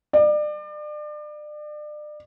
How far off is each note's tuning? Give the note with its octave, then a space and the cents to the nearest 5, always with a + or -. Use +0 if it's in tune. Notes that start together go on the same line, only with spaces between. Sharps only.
D5 +35